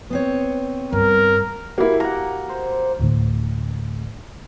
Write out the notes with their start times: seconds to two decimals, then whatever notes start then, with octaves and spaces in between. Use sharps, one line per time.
0.10 B3 C4 C#5
0.92 G2 A#4
1.78 A#3 E4 F#4 G4
2.00 A#3 F#5 A#5
2.49 C5
3.00 D2 A2 D3